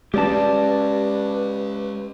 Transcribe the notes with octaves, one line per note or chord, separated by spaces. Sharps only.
G#3 C#4 G4 B4 D5 A5